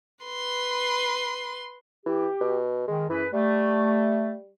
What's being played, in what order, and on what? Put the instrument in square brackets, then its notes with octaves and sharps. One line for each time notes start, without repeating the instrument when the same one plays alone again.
[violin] B4 C6
[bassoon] E3 [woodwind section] G4
[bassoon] B2
[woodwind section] D#3 [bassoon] G#3
[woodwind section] F#2 G#4 B4 [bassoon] E3
[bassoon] G3 [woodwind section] A3